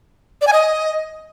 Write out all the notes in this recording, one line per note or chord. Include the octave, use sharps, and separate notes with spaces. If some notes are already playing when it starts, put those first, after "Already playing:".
D5
G#5
D#5